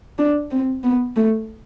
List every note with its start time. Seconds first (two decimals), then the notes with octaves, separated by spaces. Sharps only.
0.18 D4
0.51 C4
0.84 B3
1.16 A3